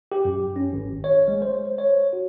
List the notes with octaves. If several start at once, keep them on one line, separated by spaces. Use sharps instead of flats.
G4
F#2
C#4
G#1
C#5
G#3
C5
C#5
F#4